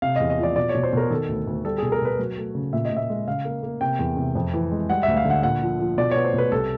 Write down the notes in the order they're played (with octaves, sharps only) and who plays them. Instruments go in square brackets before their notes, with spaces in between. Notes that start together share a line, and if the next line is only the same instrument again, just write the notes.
[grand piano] C3 F5
E2 D#5
D#5
F3
D5
B2 D5
C#5
B2
C5
B2 A#4
D#3 A4
D2
D2
G3 A4
B2 G#4
A#4
B2 B4
F#3
A3
C#3
A#2 E5
D#5
A#2
E5
G#3
C#3 F5
A#3
A#3
C3 G5
E2
C3
F2
E3
G#3
G3 F#5
D2 E5
F5
D3
F#5
A#2 F#5
F3
F3
B2 D5
B3 C#5
C5
B2 B4
C2 A4